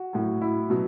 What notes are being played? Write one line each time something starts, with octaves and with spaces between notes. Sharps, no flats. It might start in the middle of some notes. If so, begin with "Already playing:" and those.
Already playing: F#4
A2 F#3
E4
B2 F#3